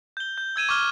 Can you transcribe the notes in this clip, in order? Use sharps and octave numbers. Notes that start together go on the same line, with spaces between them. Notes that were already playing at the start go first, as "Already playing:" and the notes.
G6 G7
G6
E6 G#6 D#7 E7
C#6 D6 F6 G7